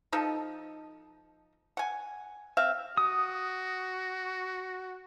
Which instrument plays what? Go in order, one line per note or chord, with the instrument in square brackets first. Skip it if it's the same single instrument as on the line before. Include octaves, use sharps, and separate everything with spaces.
[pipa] F3 D#4 A4 D#5
F#5 G#5
C4 E5 F5
[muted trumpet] F#4 [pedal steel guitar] D#6